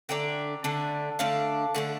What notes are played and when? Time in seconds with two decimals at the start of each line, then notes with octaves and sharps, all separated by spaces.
0.09 D3 A3 D4 G5 A#5
0.64 D3 A3 D4
1.19 D3 A3 D4 F5 A5
1.74 D3 A3 D4